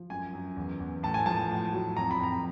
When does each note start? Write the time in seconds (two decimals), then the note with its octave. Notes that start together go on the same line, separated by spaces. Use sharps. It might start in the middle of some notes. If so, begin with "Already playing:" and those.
Already playing: F3
0.10 F#2 G#5
0.33 F#2
0.56 E2
0.79 E2
1.03 A2 A5
1.14 G#5
1.26 F3 A5
1.50 A2
1.73 F#3
1.97 F2 A#5
2.11 B5
2.20 F2 A#5